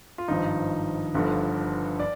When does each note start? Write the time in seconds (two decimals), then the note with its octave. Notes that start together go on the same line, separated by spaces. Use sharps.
0.18 F4
0.28 G#1 G2 F3 D#4
1.14 G1 G2 D3 F3
2.00 D5